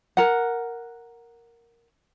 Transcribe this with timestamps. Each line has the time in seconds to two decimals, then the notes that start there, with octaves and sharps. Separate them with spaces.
0.17 A#4 F#5